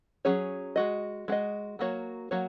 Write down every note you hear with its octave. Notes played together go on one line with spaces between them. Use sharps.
F#3 C#4 G#4 C#5
G#3 F#4 D#5
G#3 F#4 D#5
F#3 A#3 F#4 C#5
F#3 A#3 F#4 C#5